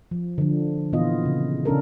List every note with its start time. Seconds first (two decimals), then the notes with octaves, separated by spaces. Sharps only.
0.11 F3
0.38 D3 F3
0.93 A#2 E3 B3 F4 D#5
1.26 C#3
1.65 C#3 C#4 D4 A4 A#4